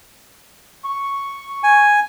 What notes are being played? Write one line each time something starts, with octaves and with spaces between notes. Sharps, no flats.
C#6
G#5